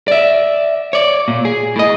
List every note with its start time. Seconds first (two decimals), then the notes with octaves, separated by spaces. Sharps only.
0.08 D5 E5
0.93 C#5 D5
1.28 A#2
1.45 G#4
1.76 A2 D#5